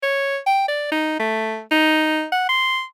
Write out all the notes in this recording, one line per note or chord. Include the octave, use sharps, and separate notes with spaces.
C#5
G5
D5
D#4
A3
D#4
F#5
C6